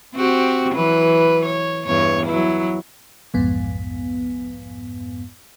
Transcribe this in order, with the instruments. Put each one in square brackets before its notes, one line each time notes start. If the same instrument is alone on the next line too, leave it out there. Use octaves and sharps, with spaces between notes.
[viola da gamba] C4 F#4 G4
E3 F#3 B4
C#5
E2 G2 C#5
F#3 E4
[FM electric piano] B1 F2 G#2 B3